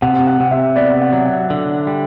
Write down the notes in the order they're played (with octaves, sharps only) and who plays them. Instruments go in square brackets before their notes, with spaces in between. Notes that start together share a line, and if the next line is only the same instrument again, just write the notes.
[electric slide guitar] C3 [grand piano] F#5
[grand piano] F#5
[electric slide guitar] C3
[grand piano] E5
[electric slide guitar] B3 [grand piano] D5
[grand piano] F#5
[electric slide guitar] F#3
[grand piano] F#5
[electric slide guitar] D3
G3